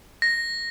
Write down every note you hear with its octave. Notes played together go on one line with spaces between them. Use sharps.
A#6